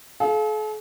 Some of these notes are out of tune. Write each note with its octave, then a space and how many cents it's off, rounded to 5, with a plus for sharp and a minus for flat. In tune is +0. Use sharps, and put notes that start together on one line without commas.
A4 -45 F5 +0